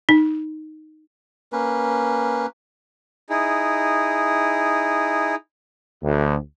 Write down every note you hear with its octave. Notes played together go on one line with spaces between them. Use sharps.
D#4
A#3 C#4 B4
D#4 E4 G#4
D2